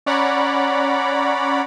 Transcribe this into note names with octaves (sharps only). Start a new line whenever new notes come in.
C#4 C#5 D5 F#5 A#5 B5